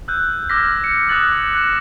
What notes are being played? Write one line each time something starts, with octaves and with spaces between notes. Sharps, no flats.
E6 F#6 G6
D6 E6 F6 G#6 A#6 B6
C#7
D6 D#6 F#6 A6 F#7
F#6 A#6 E7